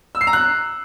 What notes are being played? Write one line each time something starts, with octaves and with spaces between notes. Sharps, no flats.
E6
C7
A#5
F#6